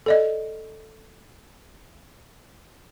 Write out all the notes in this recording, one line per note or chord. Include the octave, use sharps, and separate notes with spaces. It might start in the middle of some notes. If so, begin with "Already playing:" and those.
A4 D5 D#5